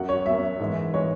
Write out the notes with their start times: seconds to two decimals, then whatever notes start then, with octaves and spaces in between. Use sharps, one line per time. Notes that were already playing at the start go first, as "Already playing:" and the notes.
Already playing: F#2 F#3 F#5
0.09 C#5
0.25 F#2 F#3 E5
0.59 G#2 E3 G#3
0.94 E3 G#3 C#5